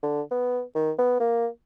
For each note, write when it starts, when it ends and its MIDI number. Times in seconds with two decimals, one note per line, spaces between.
0.03 0.22 50
0.31 0.62 59
0.75 0.91 51
0.99 1.18 59
1.20 1.47 58